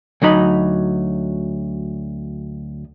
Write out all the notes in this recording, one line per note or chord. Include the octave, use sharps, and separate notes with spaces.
D2 F#3 D#4 B5